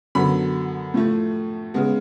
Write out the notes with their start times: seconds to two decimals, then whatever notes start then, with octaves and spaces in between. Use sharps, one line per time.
0.15 F#2 D3 F#3 B3 B5
0.94 A2 F3 A3
1.74 C#3 G#3 B3